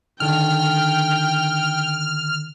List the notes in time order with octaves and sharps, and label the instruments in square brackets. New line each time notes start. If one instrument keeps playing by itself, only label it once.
[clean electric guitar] D3 D#3 A4 [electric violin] G5 [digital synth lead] F6